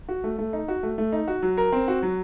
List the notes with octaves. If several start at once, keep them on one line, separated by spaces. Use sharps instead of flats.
F#4
A3
A3
D#4
F#4
A3
A3
D#4
F#4
F#3
A#4
C4
F#4
F#3